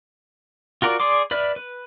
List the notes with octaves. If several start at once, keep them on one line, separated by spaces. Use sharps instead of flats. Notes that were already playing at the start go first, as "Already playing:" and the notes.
F4 F#4 A#4 D5
G#4 D5 C6 D6
B4 D5 E5 F6
B4